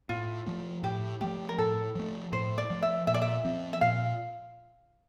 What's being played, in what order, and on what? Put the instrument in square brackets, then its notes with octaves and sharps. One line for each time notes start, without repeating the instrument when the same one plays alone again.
[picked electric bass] A2 [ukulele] F4
[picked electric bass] F3 A3
[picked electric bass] A2 [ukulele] G4
[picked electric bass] F3 A3 [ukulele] G4
[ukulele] A#4
[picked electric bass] A2 [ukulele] A4
[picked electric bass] F3 A3
[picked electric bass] A2 [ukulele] C5
[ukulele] D5
[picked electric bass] F3 A3
[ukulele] E5
[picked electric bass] A#2 [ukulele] E5
[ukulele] D5
E5
[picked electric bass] F3 C4
[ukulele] E5
[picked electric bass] A#2 [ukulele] F5